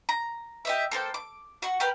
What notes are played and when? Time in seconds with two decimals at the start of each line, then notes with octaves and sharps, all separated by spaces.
0.09 A#5
0.65 G4 D#5 E5
0.91 A#3 A4 C5 G5
1.14 D6
1.62 F#4 C#6
1.80 G4 A#4 B4